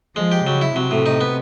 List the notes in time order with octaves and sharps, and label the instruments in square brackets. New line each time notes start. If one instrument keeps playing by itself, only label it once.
[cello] F3 [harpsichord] G#3
[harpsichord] G4
[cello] C#3 [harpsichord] F#3
[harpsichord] E4
[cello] C3 [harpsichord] F#3
[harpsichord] A2
D#4
B3